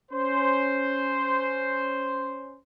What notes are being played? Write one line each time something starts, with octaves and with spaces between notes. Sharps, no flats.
C#4 C5